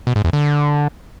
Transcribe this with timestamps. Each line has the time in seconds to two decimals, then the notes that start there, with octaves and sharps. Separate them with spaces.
0.07 B2
0.16 G#2
0.24 E2
0.33 D3